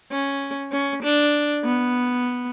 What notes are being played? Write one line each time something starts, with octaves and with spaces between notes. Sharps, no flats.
C#4
C#4
D4
B3